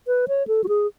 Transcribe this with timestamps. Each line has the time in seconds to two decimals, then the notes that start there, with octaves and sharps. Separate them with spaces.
0.07 B4
0.28 C#5
0.47 A4
0.64 F#4
0.68 G#4